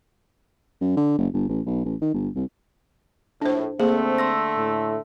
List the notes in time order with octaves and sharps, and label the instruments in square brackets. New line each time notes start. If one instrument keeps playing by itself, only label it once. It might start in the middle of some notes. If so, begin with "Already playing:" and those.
[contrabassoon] F#2
D3
F#1
G1
A1
B1
A1
D#3
G1
C2
[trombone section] A#1 A2 [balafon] D4 C5
[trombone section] D3 A3 [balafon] A#3 G#4 [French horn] C4 [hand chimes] C5
[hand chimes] C6 E6 A#6
[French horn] A2